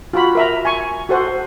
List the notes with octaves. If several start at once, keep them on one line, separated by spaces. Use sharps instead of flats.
F4 F#4 B5
A#4 E5 A#5
G#5 C#6
F#4 A4 C5 F#5